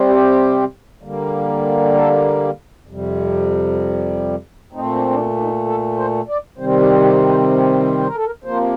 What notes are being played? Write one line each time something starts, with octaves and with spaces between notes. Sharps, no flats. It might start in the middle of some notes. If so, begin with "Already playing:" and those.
Already playing: C3 G3 C4
G4
D3 G3 A#3
A4
F2 C3 G3
A#2 A3 C4 D#4
D4
D4
C4
D4
D#4
A4
C5
D5
C3 D#3 G3 C4 C5
G4
G4
C5
C5
A#4
A4
A#4
C3 F3 A#3 C5